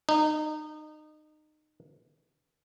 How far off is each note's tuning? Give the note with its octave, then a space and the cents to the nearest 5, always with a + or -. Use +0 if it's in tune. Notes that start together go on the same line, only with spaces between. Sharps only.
D#4 -25